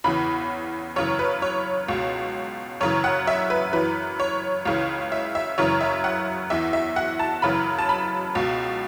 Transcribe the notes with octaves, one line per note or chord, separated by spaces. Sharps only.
E2 C#3 E3 B5
F#2 C#3 E3 C#5
B4
C#5
C#2 B2
F#2 C#3 E3 C#5
F#5
E5
B4
F#2 E3 B4
C#5
C#2 C#3 E3
E5
E5
F#2 C#3 E3 C#5
E5
F#5
E2 E3 E5
E5
F#5
A5
F#2 C#3 E3 B5
A5
B5
C#2 B2